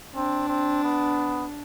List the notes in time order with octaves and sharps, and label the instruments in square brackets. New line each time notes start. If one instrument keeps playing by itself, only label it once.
[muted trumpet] C4 [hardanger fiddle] D4
[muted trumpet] C4
B3